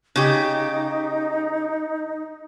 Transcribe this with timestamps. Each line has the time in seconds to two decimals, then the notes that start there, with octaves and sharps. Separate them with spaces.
0.16 C#3 D#4 G4